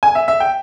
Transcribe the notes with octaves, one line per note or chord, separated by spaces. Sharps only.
G#5
E5
E5
G5